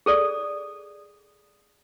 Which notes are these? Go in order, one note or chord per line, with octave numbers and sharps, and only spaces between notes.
G#4 A4 D5